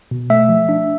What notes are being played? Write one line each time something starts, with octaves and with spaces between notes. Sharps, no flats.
B2
A3 E5
F3
D4